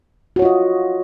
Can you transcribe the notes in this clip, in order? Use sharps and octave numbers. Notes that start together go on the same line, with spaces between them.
F4 F#4 C#5 D#5